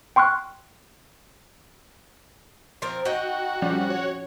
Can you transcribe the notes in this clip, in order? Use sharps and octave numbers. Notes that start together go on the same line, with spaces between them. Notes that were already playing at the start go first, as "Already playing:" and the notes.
G5 C6 C#6 F6 F#6
F3 C4 A#4
D#4 F#4 G5
F3 G3 C#4
C#5